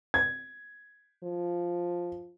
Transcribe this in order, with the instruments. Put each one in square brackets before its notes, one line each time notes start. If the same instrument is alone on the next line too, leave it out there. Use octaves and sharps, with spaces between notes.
[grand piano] G#6
[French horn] F3